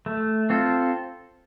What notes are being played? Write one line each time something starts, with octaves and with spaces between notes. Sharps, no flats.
A3
C4 F4 A4